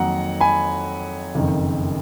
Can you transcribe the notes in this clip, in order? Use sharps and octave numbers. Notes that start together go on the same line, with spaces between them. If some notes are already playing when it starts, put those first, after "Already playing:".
Already playing: F2 D#3 F#3 A#3 F#5 A#5
G#5 B5
F#1 F2 D#3